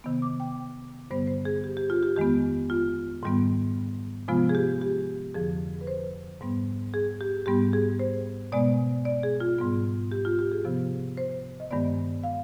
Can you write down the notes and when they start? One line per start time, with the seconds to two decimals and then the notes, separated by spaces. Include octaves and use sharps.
0.04 C3 D#3 B3
0.22 D6
0.40 G5
1.10 G2 D3 G3 B3 C5
1.27 C5
1.45 G#4
1.64 G4
1.77 G4
1.90 F4
2.03 G4
2.16 F2 D#3 G#3 B3 G4
2.70 F4
3.23 G#2 D#3 G3 B3
4.28 C3 F3 G#3 B3 F4
4.49 G#4
4.55 G4
4.82 G4
5.34 F2 D3 F3 G#4
5.81 B4
5.87 C5
6.41 G#2 G3 B3
6.94 G#4
7.21 G4
7.46 G#2 G3 B3 G4
7.73 G#4
7.99 C5
8.52 B2 G#3 B3 D5
9.05 D5
9.23 G#4
9.40 F4
9.59 G#2 G3 B3
10.12 G4
10.25 F4
10.39 G4
10.52 G#4
10.65 C3 F3 B3
11.17 C5
11.60 D#5
11.71 G2 D#3 G#3 B3 D5
12.23 F5